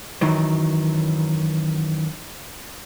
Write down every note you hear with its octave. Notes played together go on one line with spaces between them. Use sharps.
F#2 D#3 E3 F#3